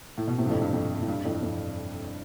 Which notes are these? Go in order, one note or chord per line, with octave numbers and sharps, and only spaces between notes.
A2
B2
A2 C3
G2
F2 A2
G2
F2
A2
G2
F2 A2
F2 A2